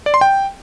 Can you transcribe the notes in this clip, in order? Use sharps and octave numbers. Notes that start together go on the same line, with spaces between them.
D5
C6
G5